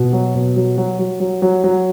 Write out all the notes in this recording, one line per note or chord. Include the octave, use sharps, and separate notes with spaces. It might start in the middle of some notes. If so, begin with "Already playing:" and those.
Already playing: B2
F#3
B2
F#3
F#3
F#3
F#3
F#3
F#3